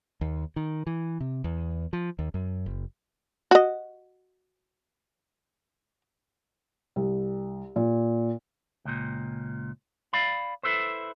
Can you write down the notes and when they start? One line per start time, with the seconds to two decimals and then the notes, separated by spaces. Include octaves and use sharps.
0.21 D#2
0.56 D#3
0.87 E3
1.20 C3
1.44 E2
1.93 F3
2.19 D#2
2.34 F#2
2.66 F#1
3.51 F#4 D#5
6.96 C2
7.76 A#2
8.85 C#2 A#2
10.13 D5 F5 B5
10.63 E4 A4 B4 C5